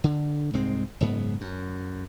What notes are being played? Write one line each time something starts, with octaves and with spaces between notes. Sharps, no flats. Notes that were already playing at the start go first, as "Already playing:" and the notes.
D3
C2 G#2 G#3 C4
F#1 G#2 B3
F#2